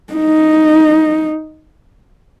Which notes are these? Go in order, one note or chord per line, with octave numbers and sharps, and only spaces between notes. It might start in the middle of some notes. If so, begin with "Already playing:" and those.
D#4